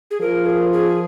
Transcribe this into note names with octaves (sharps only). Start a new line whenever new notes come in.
G#4
F3 A#4
G#4
G#4